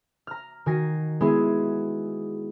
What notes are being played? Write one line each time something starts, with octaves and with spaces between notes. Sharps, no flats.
A#5 F6
D#3 F#4 G#5 A#6 C7
G#3 B3 E4 G#4